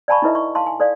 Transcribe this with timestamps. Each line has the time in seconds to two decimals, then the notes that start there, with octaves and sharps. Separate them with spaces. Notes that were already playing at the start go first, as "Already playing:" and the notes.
0.08 D5 F5 G#5 A5 B5 C#6
0.22 D#4 E4 A4 B4 D#5 E5
0.35 C#6
0.55 F5 A5 C6
0.67 G#5
0.80 A4 D5 F5